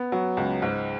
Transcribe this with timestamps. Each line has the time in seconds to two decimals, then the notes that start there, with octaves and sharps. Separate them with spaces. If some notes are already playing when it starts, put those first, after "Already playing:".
Already playing: B3
0.12 F#3
0.37 C#2
0.62 G#2